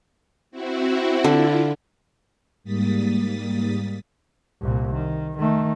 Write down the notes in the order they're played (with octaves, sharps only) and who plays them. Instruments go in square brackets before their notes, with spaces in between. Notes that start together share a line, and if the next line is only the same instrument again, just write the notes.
[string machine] C4 E4 F#4
[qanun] D3 [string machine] E4 F4
[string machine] G#2 G3 A#3 D#6 A6 B6
[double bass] C2 A#2
D#3
D#3 A3